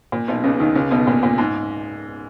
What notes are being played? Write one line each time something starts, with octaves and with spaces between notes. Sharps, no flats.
A#2
B1 B2
C#2 C#3
D#2 D#3
C#2 C#3
B1 B2
A#2
A#2
G#2